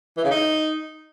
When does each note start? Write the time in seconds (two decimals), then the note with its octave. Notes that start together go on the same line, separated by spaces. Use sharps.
0.17 E3
0.24 C#3
0.31 D#4